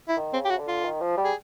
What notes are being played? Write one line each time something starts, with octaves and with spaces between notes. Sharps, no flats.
E4
D#3
C#3 C4
G4
F#4
D3
F4
D#3
F3
G3
G#4